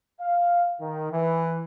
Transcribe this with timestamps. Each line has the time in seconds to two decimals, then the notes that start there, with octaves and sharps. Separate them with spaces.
0.21 F5
0.81 D#3
1.12 E3